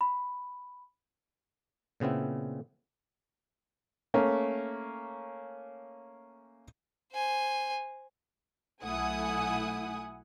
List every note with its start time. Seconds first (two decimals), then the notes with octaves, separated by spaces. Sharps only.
0.01 B5
2.00 A#2 C#3 B3 C4 E4
4.14 A3 A#3 C#4
7.13 C5 G#5
8.83 B1 A3 E4 F#5 G#5 D#6